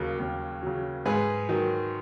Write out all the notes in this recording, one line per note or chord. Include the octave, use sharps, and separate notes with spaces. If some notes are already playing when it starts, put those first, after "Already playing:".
Already playing: D#2 C#3 F#3
D#2
C#3 F#3
G#2 G#4 B4
D#3 F#3